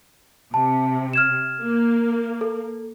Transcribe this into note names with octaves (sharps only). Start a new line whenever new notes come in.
C3 A5
F6 G#6 E7
A#3
A4